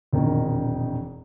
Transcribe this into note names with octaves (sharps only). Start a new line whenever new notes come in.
E1 A#1 F2 B2 D#3